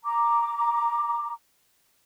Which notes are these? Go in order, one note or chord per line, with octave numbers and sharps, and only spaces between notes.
A#5 D6